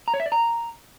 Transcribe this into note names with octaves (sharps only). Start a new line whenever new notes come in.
A#5
C#5
E5
D5
A#5